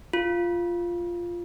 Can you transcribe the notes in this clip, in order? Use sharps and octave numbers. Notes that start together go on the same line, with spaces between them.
F4